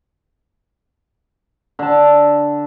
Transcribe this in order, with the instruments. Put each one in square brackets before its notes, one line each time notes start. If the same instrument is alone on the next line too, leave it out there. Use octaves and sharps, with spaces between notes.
[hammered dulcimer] D3 A5